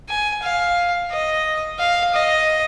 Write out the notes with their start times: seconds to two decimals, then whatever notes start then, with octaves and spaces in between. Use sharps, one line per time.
0.09 G#5
0.42 F5
1.11 D#5
1.79 F5
2.14 D#5